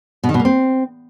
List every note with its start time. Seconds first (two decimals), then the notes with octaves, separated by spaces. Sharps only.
0.24 B2
0.29 D#3
0.34 B2
0.40 A#3
0.45 C4